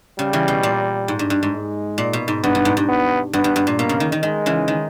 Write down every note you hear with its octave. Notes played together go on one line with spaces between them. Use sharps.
C#3 G3
C#3 E3
B2
A#2
G#2
G2
G2
G#2
G#3
A#2
B2
G#2
G2 B3
G2
G#2
G2
B3
G2 B3
G2
G2
A#2
B2 A#3
C#3
D#3
D#3
D#3 G#3
C#3 E3
D#3